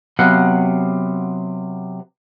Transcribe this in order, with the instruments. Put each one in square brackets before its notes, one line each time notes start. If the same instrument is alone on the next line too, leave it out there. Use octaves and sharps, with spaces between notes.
[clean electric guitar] C3 F#3 B3 F5 F#5